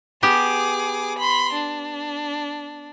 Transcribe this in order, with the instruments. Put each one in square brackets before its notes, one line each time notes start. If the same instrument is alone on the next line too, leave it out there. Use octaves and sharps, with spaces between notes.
[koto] B3 G4 [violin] G#4 D6
[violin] B5 C6
D4